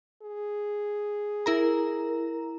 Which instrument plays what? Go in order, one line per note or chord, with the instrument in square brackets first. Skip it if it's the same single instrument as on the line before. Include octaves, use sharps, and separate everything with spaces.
[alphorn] G#4
[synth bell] E4 A#4 A#5